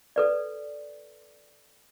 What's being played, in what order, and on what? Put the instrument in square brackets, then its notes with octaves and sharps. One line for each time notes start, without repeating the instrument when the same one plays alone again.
[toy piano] A4 B4 D5